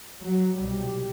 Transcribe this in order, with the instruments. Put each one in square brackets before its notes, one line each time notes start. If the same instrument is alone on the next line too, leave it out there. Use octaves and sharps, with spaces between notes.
[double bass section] F#3
C2 B2 G3